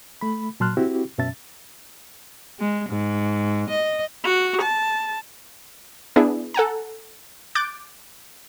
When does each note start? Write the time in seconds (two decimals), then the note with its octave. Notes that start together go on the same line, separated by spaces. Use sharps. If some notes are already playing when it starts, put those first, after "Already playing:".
0.21 A3 B5
0.60 A#2 F#3 A5 C6 F6 F#6
0.77 C4 E4 F#4 G4
1.18 F#2 B2 C#4 E5 A5 A6
2.60 G#3
2.89 G#2
3.70 D#5
4.24 F#4
4.62 A5
6.16 B3 D4 E4 G#4
6.54 A4 F#5 G#5 A#5
7.55 D6 F#6 G6 A6 D7